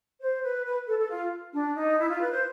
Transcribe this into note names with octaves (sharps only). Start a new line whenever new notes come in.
C5
B4
B4
A4
A4
F4
D4
D#4
E4
F4
B4
C5